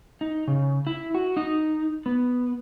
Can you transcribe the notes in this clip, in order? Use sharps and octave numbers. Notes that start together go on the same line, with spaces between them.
D#4
C#3
E4
F#4
D#4
B3